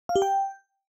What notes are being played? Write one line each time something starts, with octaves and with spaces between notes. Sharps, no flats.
F5
G4
G5